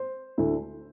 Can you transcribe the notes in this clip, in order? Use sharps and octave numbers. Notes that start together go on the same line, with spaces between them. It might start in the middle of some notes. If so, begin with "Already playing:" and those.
Already playing: C5
D2 D3 A3 E4